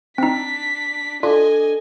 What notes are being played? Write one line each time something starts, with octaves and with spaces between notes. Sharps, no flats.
C4 D4 D#4 B6
D4 F4 A4 D#5 G#5